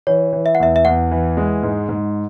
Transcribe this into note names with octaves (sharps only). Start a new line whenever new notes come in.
E3 C#5
E3
E5
F#5
E2 E5
E5
E2 F#5
E3
G#3
G#2
G#2